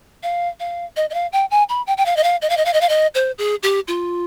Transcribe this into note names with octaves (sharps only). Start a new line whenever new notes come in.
F5
F5
D#5
D#5
F5
G5
G#5
B5
G5
G5
F5
D#5
F5
D#5
F5
D#5
F5
D#5
F5
D#5
C5
G#4
G4
F4